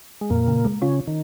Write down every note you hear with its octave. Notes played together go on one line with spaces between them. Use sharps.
G#3
F2 A#2 A#3
C#3
G#3
C#3 C#4 F4
D#3